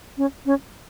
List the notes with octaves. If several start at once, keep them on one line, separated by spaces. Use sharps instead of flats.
C#4
C#4